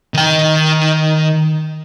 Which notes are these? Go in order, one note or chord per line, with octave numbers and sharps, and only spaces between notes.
D#3 G5